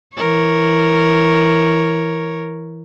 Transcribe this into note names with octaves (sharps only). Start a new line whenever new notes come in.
E3 A#4 C#5